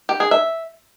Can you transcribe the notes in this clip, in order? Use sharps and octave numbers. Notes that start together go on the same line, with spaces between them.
G4
G#4
E5